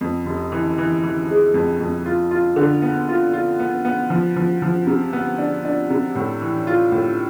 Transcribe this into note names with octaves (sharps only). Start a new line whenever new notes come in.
F2
F1
E3
E3
E3
G#3
F2
F2
F4
F4
D3
B3
F4
F4
B3
B3
F3
F3
F3
C3
B3
D4
D4
C3
A2
E3
F4
A2